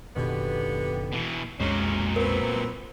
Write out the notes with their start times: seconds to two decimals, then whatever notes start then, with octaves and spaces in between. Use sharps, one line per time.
0.16 F#1 B2 D3 D#3 B3 G4
1.12 B2 E3
1.60 B1 F2 A#2 F#3 G#3 C#4
2.16 B3 C4 A#4